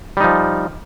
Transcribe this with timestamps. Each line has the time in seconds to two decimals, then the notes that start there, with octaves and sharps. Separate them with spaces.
0.17 G3
0.20 D#4
0.24 F3